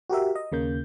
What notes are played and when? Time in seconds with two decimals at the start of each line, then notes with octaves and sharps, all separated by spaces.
0.10 F#4 G4 A#4 E5
0.36 D#5
0.52 D#2 C#3 A#3 G6